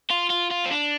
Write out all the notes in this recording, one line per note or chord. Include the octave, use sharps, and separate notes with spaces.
F4
F4
F4
C4
D4